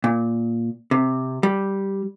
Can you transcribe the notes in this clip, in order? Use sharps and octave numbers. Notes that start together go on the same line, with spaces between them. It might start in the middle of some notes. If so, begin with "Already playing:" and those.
A#2
C3
G3